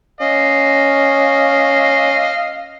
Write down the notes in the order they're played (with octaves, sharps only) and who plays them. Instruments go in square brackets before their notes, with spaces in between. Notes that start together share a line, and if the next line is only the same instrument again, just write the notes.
[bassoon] C#4 [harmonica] D#5 F5